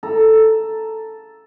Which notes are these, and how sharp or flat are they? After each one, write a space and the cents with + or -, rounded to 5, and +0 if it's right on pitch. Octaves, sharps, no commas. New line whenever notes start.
A4 +0 A#5 +0